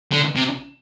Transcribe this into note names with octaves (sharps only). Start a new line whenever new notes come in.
D3
C3